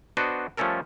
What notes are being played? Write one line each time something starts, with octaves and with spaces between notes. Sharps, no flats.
B3 D4 F#4 C5 D#5
F3 G3 A3 C#4 A4 A#4